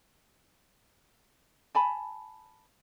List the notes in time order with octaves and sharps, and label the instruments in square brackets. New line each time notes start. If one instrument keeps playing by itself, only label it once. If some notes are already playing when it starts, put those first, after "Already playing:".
[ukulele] G#5 A5 B5